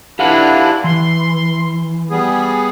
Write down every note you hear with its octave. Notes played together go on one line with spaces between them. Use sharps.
E3 D4 E4 G4 F5 F#5
E3 C6
G3 B3 G#4